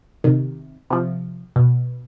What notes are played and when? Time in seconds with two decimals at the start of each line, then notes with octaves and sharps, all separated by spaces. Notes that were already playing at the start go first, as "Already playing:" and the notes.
0.24 C3 D#3
0.90 C3 F3
1.56 B2